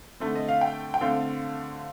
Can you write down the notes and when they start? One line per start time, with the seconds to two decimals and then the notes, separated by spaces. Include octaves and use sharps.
0.20 D3 A3 C4
0.35 D#5
0.48 F5
0.61 G5
0.94 G5
1.01 D3 A3 C4 F5